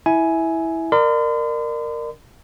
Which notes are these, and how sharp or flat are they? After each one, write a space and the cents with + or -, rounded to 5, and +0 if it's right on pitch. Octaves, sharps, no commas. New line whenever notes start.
E4 -10 E5 -10 G#5 +10
A#4 -5 D5 +35 C6 -45